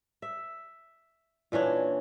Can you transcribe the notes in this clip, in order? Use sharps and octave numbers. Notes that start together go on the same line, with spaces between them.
E5
A#2 E3 C#4 D4